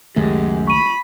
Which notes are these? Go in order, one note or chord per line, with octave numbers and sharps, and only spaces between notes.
C#2 F#2 D#3 G#3 A3 G4
B5 C#6 D#7